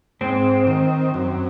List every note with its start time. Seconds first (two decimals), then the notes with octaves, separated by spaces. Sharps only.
0.21 G#2 C4
0.67 D#3
1.14 F#2